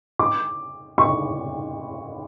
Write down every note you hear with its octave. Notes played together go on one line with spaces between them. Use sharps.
D6
C#6